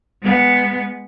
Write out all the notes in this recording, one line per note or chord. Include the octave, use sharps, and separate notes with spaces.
G#3 B3